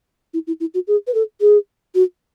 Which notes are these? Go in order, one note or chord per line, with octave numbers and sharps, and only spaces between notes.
E4
E4
E4
F#4
G#4
B4
A4
G#4
F#4